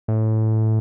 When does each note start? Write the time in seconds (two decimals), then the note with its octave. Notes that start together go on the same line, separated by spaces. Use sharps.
0.08 A2